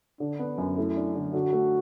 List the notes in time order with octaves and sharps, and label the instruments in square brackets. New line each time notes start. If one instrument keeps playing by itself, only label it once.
[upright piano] D3 [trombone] D4
[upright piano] B3
F#2
[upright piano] A3 [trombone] E4
[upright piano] D4
D3
[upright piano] D3 [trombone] F#4
[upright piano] A3